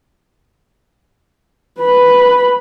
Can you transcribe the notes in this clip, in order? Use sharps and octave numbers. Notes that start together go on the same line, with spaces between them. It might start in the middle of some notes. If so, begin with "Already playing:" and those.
B4 B5